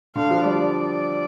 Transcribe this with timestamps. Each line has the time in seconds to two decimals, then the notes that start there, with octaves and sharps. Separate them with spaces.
0.16 D3 F5
0.30 F3
0.44 G3 D5